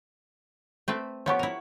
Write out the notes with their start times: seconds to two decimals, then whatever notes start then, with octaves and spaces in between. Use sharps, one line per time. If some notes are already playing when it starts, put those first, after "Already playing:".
0.88 A3 C4 B4
1.26 F3 B3 G4 C#5 F#5 C#6
1.39 E4 A#4